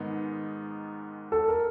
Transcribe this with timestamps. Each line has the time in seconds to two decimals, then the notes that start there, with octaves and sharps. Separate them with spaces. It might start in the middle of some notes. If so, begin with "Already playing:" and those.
Already playing: G#2 D#3 G#3 B3 D#4
1.32 A4
1.48 A#4